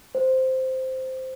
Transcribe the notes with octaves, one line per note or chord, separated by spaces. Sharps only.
C5